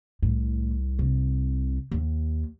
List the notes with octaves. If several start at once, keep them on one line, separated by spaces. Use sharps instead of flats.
C2 A2
C3
D#2